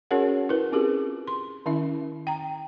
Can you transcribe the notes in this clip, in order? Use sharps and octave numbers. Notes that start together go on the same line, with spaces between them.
C#4 F#4 G#4 A#4 C#5 F#5
E4 A#4 B4
C4 C#4 F4 G4 G#4 A#4
C6
D#3 C#4 E4 E5
G5 A#5